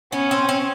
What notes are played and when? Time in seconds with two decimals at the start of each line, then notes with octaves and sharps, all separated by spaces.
0.12 B3 C#4
0.31 C4
0.49 C4